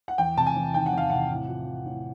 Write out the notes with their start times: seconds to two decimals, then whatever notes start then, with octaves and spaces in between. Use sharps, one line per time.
0.08 F#5
0.18 E2 G5
0.37 C3 A5
0.46 G#5
0.56 E2
0.74 D#3 G5
0.86 F#5
0.93 E2 F5
1.10 C3 F#5
1.30 A2
1.48 F3
1.67 F3
1.85 A2